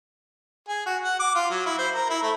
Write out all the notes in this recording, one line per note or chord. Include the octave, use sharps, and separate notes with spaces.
G#4
F#4
F#5
D6
F4
F#3
E4
C5
A#4
E4
A3